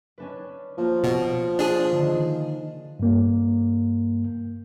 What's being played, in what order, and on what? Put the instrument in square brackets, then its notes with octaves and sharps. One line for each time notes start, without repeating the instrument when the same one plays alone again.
[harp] C#4 D4 B4
[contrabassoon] F3 [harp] A#3
[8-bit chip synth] B2
D4 G#4
[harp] D3 D#3
[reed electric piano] G2 A#3